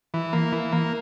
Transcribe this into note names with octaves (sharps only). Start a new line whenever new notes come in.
E3
A#3
E3
A#3